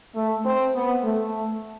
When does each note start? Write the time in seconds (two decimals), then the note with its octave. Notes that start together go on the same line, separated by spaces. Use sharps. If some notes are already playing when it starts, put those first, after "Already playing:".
0.16 A3
0.45 C4
0.75 B3
1.04 A3